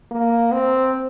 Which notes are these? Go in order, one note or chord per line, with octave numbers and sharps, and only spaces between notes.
A#3
C4